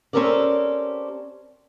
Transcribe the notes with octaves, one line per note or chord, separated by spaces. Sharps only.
C4 C#4 G4 A4 A#4 D5